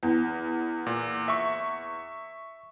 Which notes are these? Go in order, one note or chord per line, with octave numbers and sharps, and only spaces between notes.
E2
A#2
E5 C#6